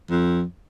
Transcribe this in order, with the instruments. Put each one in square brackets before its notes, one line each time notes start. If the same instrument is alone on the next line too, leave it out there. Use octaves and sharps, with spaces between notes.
[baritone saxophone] F2